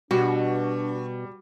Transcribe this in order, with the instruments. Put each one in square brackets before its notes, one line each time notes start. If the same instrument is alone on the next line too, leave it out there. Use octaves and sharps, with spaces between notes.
[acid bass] B2 [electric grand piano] G3 [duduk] D4 [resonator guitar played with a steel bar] F#4